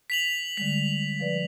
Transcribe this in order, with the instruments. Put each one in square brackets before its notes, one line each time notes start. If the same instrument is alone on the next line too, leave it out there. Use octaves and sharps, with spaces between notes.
[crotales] B6 F7 F#7
[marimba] D3 G3 G#3 [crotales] B6
[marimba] F3 B4 D5